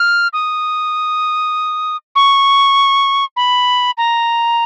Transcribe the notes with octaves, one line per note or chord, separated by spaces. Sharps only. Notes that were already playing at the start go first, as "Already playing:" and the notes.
Already playing: F6
D#6
C#6
B5
A#5